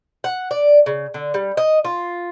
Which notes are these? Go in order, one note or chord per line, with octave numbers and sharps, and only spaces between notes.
F#5
D5
C#3
D3
G3
D#5
F4